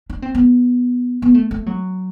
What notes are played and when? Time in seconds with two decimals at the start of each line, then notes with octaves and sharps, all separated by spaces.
0.10 D4
0.22 C4
0.35 B3
1.22 B3
1.34 A3
1.51 A3
1.66 F#3